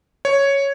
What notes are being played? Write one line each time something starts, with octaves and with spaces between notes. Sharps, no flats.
C#5